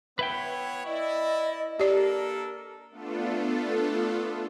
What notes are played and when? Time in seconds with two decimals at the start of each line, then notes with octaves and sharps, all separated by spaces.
0.19 B3 E4 B4 C#5 E5 G5
0.86 E4 D5 D#5
1.80 A#3 D4 G4 A4 A#4 D5
2.91 A3 B3 D4 F4 A4